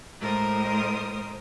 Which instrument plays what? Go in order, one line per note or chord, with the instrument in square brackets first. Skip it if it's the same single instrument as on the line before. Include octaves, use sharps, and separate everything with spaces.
[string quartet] A2 G#3 A#4 C5 D#6